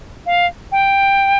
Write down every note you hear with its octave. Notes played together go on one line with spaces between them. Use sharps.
F5
G5